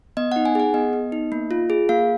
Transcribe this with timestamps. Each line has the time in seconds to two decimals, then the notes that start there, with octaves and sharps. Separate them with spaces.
0.17 B3 D#5
0.32 D#4 F#5
0.45 G#5
0.55 G#4 F#5
0.74 B3 D#5
0.93 B3
1.12 D#4
1.32 A#3
1.51 F4
1.70 G#4
1.89 A#3 F5